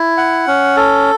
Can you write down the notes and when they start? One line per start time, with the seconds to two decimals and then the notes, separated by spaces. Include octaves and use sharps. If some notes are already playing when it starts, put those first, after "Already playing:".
Already playing: E4
0.17 F#5
0.47 C#4
0.77 A4